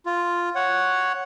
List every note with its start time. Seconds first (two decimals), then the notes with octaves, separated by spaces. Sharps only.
0.06 F4
0.55 C#5 F#5